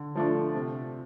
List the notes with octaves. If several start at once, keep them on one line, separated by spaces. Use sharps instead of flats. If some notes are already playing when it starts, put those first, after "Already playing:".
Already playing: D3
F3 A3 D4
C3